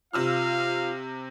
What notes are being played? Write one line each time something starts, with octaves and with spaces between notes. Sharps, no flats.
C3 F4 F5 E6 F6